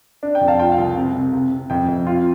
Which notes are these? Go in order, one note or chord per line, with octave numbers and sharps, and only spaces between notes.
D4
G5
F2
F5 A5
F4 G5
F5
C2
C3
C3
C3
C3
F2 G5
F2
F4